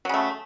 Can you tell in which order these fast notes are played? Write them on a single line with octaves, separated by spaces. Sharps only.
F#3 C#3 A3